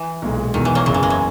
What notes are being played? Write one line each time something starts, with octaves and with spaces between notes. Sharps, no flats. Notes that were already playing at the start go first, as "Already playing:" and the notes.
Already playing: E3
B1 A#2 G#3
E1 E2 B2 D#3
E3
F#3 A#3
F#1 F#2 C#3 F#3
E3
G#3
F#3